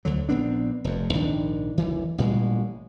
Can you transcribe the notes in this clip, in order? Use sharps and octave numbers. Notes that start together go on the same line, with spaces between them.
D2 D3 F#3
A#1 B3 C4 D4
F1 F2
A#1 G#2 D#3 D4
F#1 D2 E3
A1 A#2 G3 G#3